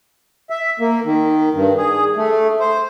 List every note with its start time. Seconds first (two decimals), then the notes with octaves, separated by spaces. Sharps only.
0.50 E5
0.80 A#3
1.04 D#3
1.54 G2
1.77 G#4
2.16 A3
2.60 C5